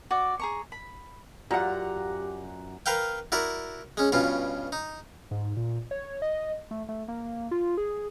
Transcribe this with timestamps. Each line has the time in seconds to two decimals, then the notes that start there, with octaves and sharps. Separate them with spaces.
0.11 F#4 D5 D6
0.39 G#4 A#5 C#6
0.72 B5
1.51 F#2 F4 G4 D5 F#5 A#5
2.86 A#4 B4 F5 G5
3.32 E4 F#4 A#4 D5
3.97 G#3 C#4
4.12 G2 B2 C#4 F4
4.72 D#4
5.31 G#2
5.57 A#2
5.91 C#5
6.22 D#5
6.71 A3
6.89 A3
7.08 A#3
7.51 F4
7.77 G#4